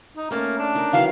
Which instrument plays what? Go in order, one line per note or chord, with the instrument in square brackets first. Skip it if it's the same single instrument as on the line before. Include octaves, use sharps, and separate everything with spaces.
[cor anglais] D#4
[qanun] A3 C#4 A5 [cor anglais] A#3
[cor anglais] D4
[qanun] D#4 A#4
[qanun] D#3 E3 F#3 [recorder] F5